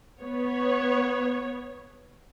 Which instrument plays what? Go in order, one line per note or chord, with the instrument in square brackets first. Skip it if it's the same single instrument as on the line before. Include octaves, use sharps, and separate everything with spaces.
[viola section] B3 C#5